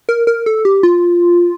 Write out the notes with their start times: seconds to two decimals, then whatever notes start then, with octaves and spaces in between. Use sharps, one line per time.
0.09 A#4
0.27 A#4
0.46 A4
0.65 G4
0.83 F4